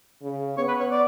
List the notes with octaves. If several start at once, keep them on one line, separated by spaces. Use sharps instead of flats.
C#3
B3 C#5
B4
C#5
D5